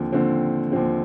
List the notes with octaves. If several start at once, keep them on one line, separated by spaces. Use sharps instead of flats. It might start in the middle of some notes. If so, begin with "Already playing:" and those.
Already playing: D#2 D3 F3 C4
D#2 D3 F3 C4
D#2 D3 F3 C4